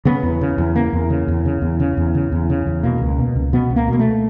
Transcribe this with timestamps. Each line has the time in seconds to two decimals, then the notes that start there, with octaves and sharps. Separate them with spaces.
0.05 C#3 B3
0.23 E2
0.41 C#3
0.58 E2
0.76 C#3 A#3
0.93 E2
1.10 C#3
1.28 E2
1.45 C#3
1.62 E2
1.80 C#3
1.97 E2
2.15 C#3
2.32 E2
2.50 C#3
2.67 E2
2.83 B2 A#3
3.01 C#2
3.19 B2
3.36 C#2
3.53 B2 B3
3.70 C#2
3.76 A#3
3.88 B2 A#3
3.99 A3